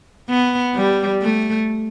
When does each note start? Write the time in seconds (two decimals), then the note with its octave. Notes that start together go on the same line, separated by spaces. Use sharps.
0.29 B3
0.76 G3
1.22 A3